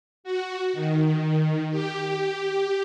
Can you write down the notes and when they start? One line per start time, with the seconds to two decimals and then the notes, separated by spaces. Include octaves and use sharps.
0.24 F#4
0.73 D#3
1.70 G4